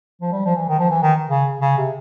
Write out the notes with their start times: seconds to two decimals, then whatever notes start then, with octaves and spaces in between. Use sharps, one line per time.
0.21 F3
0.32 G3
0.45 F3
0.56 E3
0.68 D#3
0.79 F3
0.91 E3
1.02 D#3
1.30 C#3
1.61 C#3
1.78 C3